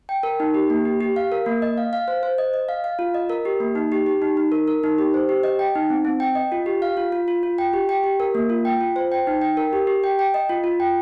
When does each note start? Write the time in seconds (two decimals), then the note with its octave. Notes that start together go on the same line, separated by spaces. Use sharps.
0.09 G5
0.23 A#4
0.40 D#4
0.54 G4
0.70 A#3
0.85 G4
1.01 G4
1.16 F5
1.32 A#4
1.46 A#3
1.62 D#5
1.78 F5
1.93 F5
2.08 C5
2.23 C5
2.38 D#5
2.54 D#5
2.69 F5
2.84 F5
2.99 F4
3.14 D#5
3.30 A#4
3.45 G4
3.60 A#3
3.75 D#4
3.92 G4
4.06 G4
4.22 D#4
4.37 D#4
4.52 A#4
4.68 A#4
4.84 D#4
4.98 G4
5.14 C5
5.29 G4
5.44 D#5
5.59 G5
5.75 D#4
5.90 C4
6.05 C4
6.20 G5
6.35 D#5
6.52 F4
6.66 G4
6.82 F5
6.97 F4
7.12 F4
7.28 F4
7.43 F4
7.58 G5
7.73 G4
7.89 G5
8.04 G4
8.20 A#4
8.35 A#3
8.50 F4
8.65 G5
8.81 F4
8.96 C5
9.12 G5
9.27 D#4
9.41 G5
9.57 A#4
9.73 G4
9.87 G4
10.04 G5
10.19 G5
10.34 D#5
10.49 F4
10.64 F4
10.80 G5